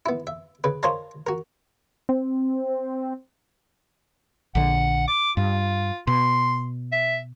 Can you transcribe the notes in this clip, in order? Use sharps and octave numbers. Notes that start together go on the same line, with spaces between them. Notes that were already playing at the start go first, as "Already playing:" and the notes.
B3 E4
E5
C#3 B4
A#4 C5 C#5 D#5 F5 A5
F#4 A#4
C4
A#1 D3 F#5
D6
G2 F4
B2 C6
E5